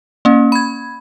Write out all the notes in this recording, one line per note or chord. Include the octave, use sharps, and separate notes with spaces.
A#3 C#4
B5 G#6